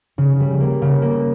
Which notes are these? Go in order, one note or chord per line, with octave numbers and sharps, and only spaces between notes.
C#3
G3
A#3
C#3
A#3